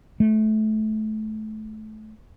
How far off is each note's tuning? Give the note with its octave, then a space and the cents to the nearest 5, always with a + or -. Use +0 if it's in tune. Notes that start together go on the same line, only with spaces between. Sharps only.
A3 -25